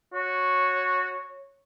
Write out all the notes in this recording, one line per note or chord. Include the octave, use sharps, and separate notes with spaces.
F#4 C#5